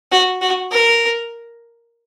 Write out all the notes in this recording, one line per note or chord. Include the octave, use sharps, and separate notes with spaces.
F#4
F#4
A#4